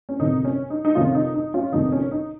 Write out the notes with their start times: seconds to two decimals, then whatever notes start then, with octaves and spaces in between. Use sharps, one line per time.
0.09 C#4
0.20 G1 F2 C3 D#3 D#4
0.45 C#4
0.70 D#4
0.85 D#4
0.95 G1 F2 C3 D#3 C#4 F4
1.15 D#4
1.34 D#4
1.54 C#4 F4
1.72 G1 F2 C3 D#3 D#4
1.92 C#4
2.12 D#4